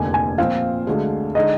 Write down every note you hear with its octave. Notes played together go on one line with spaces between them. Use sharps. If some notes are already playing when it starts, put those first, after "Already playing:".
Already playing: F1 D#2 D3 G#5
G#5
A#2 F3 C4 F4 F5
D2 D3 G#3
D3 G#3 D#4 D#5